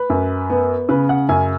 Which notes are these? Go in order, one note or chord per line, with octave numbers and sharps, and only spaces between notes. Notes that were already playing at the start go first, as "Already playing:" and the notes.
Already playing: B4
F#2
B3
C#3 B4
F#5
F#2 G#5